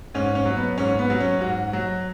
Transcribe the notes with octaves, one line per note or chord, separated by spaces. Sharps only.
G#2 C#4
C#4
F#3
B3
G#2 C#4
B3
F#3
C#4
G#2 F#4
F#3